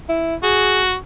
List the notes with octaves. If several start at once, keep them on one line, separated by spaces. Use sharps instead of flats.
E4
F#4 G#4